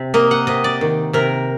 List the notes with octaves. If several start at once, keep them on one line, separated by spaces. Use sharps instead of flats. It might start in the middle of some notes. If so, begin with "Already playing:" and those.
Already playing: C3
A#3 D#5
F#5
C3 D#5
D5
D#3
C3 A#4